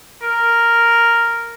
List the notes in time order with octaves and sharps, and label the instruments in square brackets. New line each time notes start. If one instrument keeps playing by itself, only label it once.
[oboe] A#4